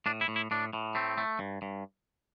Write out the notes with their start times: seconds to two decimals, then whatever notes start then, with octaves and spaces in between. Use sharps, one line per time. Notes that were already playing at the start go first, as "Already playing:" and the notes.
0.06 A2 D4
0.21 E4
0.28 A2
0.36 E4
0.51 A2 D4
0.73 A2
0.95 A3 C4
1.18 A3
1.39 G2
1.62 G2